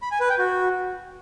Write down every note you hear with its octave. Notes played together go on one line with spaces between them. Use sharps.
B5
G#5
B4
G5
F#4